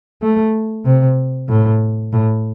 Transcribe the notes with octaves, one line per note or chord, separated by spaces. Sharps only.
A3
C3
A2
A2